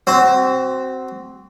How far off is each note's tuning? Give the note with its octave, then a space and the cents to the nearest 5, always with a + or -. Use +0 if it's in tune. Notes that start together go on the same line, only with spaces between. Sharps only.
C4 +0 F#4 +25